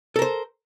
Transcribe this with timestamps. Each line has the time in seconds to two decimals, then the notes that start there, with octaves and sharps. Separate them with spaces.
0.16 A4
0.19 A#4
0.22 C5